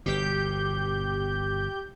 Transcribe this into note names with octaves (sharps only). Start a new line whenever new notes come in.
G1 B2 G4 G6